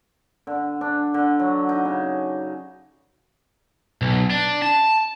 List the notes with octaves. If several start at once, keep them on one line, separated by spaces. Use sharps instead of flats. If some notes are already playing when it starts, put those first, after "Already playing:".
D3
D4
D3
F#3
D#4
C#3
B1
D4
A5